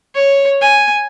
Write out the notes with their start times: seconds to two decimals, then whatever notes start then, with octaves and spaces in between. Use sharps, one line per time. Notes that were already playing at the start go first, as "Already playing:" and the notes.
0.15 C#5
0.61 G#5